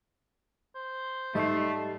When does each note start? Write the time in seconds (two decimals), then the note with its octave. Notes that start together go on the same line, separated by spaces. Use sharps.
0.75 C5
1.35 G#2 G3 A3 D#4 D#5 C6